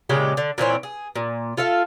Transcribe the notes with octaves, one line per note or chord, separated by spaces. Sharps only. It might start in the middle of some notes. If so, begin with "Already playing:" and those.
A#2 C#3 G#3 G4
D3
A#2 E3 C4 C#5
G#4
A#2
F4 A4 E5 F5